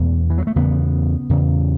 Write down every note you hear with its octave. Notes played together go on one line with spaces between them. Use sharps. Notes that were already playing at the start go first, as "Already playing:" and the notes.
Already playing: E2 B2 A3
E3
F#3
A3
E2 C#3 B3
E2 C#3